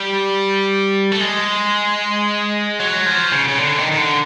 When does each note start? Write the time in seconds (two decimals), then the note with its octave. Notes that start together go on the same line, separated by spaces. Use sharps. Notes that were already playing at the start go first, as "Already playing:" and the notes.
Already playing: G3
1.12 A3
1.21 G#3
2.79 F#3
3.06 F3
3.32 C#3
3.48 C#3
3.58 D3
3.78 D#3
3.92 D#3
3.98 D3